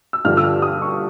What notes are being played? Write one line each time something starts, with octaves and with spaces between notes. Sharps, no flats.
E6
G2 D3 F3 F6
E6
F6
D#6
C#6